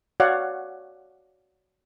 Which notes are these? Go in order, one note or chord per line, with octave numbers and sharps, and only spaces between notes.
F#4 C#5 D5 F5 F#5